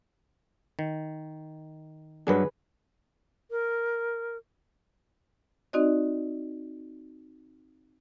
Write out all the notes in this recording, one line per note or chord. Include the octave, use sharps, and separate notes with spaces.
D#3
G2 F#3 D4 G#4 B4
A#4
C4 D#4 F#4 D5 D#5